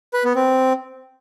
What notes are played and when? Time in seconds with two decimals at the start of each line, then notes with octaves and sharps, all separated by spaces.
0.14 B4
0.25 B3
0.36 C4